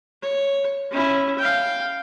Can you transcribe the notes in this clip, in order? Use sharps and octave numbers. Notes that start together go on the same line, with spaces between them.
C#5
C#4 E4
F5 G5